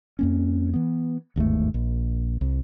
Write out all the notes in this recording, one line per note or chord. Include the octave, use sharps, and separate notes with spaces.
F2 A#3 C#4
E3 B3
G1 D#2 G#2 A3
A#1
C2